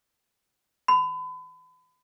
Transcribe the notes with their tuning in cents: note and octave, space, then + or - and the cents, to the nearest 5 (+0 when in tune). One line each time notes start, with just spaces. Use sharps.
B5 +35